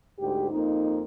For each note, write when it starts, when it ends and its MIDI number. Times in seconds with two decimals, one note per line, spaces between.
0.18 0.50 38
0.18 0.50 44
0.18 0.50 67
0.51 1.03 41
0.51 1.03 58
0.51 1.03 63